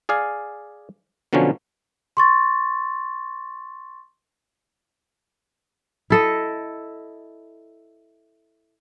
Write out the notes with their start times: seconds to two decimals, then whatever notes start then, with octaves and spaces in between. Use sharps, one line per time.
0.09 G#4 D5 F5 G#5
1.33 B2 D3 F3 F#3 C#4
2.17 C6 C#6 A6
6.10 E4 A4 D#5